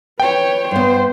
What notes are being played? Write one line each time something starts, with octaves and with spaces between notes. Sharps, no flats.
B4 C#5 G5
G2 B3 C5